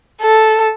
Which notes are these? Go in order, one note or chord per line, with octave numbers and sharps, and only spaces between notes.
A4